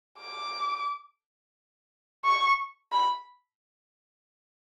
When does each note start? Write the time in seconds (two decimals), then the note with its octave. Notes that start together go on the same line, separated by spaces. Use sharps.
0.19 D6
2.24 C#6
2.92 B5